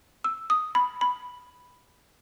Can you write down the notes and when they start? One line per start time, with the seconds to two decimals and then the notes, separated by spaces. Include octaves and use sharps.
0.24 E6
0.50 D#6
0.75 B5
1.01 B5